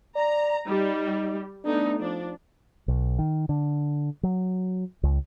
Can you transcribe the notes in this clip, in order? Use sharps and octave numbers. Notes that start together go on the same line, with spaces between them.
D5 A#5
G3 D#4
A3 B3 D4 D#4
F3 D4
B1
D#3
D3
F#3
C#2